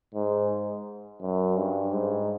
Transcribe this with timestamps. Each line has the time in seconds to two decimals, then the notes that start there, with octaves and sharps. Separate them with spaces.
0.15 G#2
1.21 F#2
1.57 G2
1.93 G#2